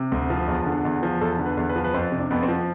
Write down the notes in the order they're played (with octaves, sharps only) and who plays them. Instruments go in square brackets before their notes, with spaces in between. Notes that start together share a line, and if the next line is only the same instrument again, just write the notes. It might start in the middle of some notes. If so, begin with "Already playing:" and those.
Already playing: [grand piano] C3
D2
F3
E2
D3
E2
F3
E2 A4
D3
B4
E2
B4
F3
B4
F2 C5
C3
D4
F2 B3
C4
F3